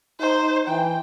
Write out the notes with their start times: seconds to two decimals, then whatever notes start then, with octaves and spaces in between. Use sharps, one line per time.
0.20 D#4 C5
0.68 E3 G5